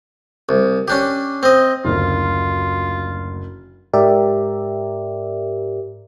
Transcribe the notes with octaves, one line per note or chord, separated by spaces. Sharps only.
C2
C#4 D4 G4
C4 D#5
F#1 D2 F4
G#2 G4 A#4 D5 E5